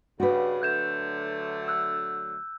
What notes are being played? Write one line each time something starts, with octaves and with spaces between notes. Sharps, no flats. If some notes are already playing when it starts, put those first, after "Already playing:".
G2 C#3 F#4 B4
D3 F#3 A3 F#6 G6 E7
E6 F#6